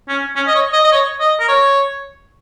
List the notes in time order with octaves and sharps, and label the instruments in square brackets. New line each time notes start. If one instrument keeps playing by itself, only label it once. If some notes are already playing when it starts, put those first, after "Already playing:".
[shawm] C#4
C#4
D#5
C#5
D#5
D#5
C#5
D#5
A#4
C#5